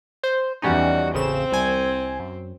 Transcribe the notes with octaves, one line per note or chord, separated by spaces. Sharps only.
C5
E2 G3 C#4 D#4 F#4
A1 C#3 C4 E7
C2 G#5
F#2